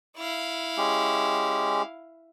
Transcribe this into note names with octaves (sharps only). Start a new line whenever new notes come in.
E4 F5
G#3 C#4 G4